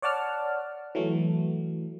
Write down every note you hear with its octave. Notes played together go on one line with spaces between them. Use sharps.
C#5 D5 F#5 A5 F6
E3 F#3 A3